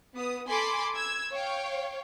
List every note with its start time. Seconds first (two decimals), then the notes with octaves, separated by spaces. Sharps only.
0.15 B3 D#6
0.48 A4 G#5 B5 C6 D6
0.96 E6 G#6
1.33 C#5 F5 G5